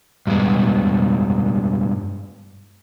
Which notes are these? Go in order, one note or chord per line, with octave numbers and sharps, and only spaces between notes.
G2 B2 G#3